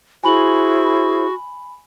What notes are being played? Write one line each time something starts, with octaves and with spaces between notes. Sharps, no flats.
E4 F#4 G#4 C5 G#5 B5 F#7